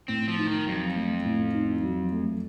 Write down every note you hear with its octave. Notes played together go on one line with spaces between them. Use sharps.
A2 C4
F3
D#4
D#3
F2 F#3
A3
A2
D#4
F#3
A3